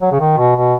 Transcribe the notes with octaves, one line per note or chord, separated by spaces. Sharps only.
F#3
C#3
D#3
B2
B2